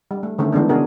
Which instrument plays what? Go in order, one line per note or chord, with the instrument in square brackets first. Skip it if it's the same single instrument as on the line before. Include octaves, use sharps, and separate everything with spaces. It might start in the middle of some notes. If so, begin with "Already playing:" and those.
[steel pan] G3
A3
D3 D#3 A3 C#4
D#3 E3 G#3 B3 D4
C#3 B3 D4 F#4 G#4 A#4